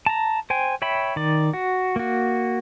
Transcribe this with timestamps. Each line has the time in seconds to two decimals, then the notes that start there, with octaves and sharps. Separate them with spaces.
0.06 A5 A#5
0.50 C5 G5 G#5
0.82 C#5 E5 G5 B5
1.16 D#3 D5
1.53 F#4
1.96 A#3 F#4